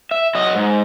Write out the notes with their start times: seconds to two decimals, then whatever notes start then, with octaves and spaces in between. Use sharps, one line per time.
0.11 E5
0.35 F#3 D#5
0.55 G#2